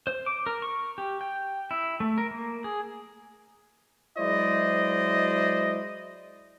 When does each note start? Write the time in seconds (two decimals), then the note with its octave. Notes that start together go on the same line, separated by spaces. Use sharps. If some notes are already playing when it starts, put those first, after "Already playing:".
0.07 C5
0.26 D6
0.46 A#4
0.62 C#6
0.98 G4
1.21 G5
1.71 E4
2.00 A3
2.18 A#4
2.31 A#3
2.64 G#4
4.18 F#3 G#3 E4 C5 D5 D#5